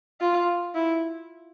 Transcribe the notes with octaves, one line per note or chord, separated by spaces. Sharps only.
F4
E4